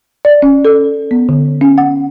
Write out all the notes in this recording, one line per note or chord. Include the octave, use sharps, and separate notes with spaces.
D5
C#4
A4
B3
D3
C#4
F#5